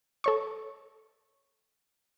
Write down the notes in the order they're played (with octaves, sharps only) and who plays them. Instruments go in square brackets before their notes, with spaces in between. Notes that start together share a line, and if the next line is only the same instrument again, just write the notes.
[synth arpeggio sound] A4 C#5 C#6